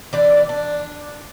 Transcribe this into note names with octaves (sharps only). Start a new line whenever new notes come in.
E3 C4 D4 D5
D4